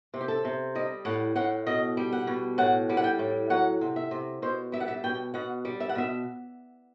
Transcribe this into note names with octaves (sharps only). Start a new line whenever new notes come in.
C3
G4
A4
C3
G3 D#5
A2 F#5
A2 F#5
B2 D#5
G3
F#5
B2
A2 F#5
G3
F#5
G5
A2
F#3 F#5
C3
E5
C3
B2 C5
G3 E5
F#5
E5
B2 G5
B2 F#5
G3
E5
F#5
B2 E5